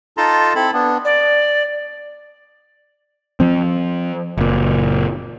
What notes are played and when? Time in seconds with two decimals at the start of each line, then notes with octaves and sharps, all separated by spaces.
0.17 D#4 F4 A4 A5 A#5 C6
0.55 C4 E4 A4 B5
0.74 B3 D4
1.05 D5
3.40 F3 C4
4.38 F#1 A#2